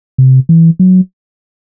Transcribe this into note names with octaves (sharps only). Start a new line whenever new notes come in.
C3
E3
F#3